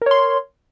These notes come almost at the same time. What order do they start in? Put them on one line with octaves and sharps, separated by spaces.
A#4 C#5 C6